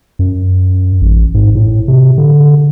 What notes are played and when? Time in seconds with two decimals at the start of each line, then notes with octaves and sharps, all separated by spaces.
0.19 F#2
1.01 A1
1.34 G#2
1.55 A2
1.88 C3
2.18 D3